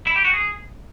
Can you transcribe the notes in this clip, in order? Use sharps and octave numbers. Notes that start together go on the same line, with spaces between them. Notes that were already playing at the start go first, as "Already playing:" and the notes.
E4
G4
F#4
G#4